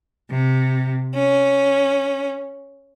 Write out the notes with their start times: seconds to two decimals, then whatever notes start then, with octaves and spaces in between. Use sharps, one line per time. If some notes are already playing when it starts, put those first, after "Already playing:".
0.30 C3
1.14 C#4